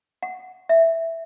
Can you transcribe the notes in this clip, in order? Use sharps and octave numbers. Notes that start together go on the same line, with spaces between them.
F#5
E5